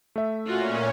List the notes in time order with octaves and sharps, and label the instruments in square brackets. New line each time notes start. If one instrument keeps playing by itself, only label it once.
[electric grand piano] A3 E5
[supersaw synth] A#2 C#4 [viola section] F4 F#4